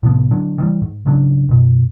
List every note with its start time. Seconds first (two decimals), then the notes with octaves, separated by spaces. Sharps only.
0.03 A2 C3 F3 B3
0.31 D3 F#3 D4
0.58 D#3 E3 G3
0.82 G#2
1.06 G#2 C#3 F#3 D4
1.49 F#2 B2